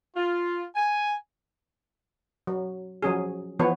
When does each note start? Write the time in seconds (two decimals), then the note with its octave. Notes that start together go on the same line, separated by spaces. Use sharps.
0.17 F4
0.76 G#5
2.47 F#3
3.03 F3 F#3 C#4 G#4
3.59 E3 F3 B3 B4 C#5